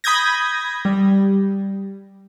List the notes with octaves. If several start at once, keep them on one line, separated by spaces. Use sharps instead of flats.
B5 D#6 G6 G#6 A#6
G3